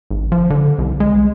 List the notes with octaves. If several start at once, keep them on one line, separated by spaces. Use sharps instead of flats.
G#1
F3
D3
C2
G#3